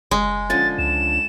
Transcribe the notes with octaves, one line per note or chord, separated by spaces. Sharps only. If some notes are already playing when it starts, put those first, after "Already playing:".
F#1 G#3
D3 F3 C#4 A6
C#2 E7